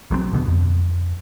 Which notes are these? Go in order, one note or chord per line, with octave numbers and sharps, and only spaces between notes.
B1 F#3 G3 C4
D#1 B2 D3 B3
F2